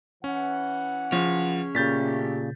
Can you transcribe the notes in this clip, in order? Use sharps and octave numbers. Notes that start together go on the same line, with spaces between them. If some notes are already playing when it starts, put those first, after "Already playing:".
E3 C#4 F#5
F3 C#4 G#4
A#2 C#3 A3 G4 G6 A6 B6